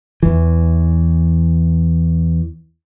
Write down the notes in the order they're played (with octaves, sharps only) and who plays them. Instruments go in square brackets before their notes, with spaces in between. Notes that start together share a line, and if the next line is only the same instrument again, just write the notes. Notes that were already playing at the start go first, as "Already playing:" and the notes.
[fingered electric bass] E2 E3